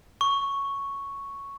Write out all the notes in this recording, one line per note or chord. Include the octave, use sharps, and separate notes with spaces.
C#6